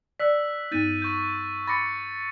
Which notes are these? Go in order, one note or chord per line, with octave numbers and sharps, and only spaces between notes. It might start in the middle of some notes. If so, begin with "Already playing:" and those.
D5 E6 F#6 B6
G2 B3 D#4 G6 A6 D#7
C#6 G6
B5 C6 D6 A6 A#6 C#7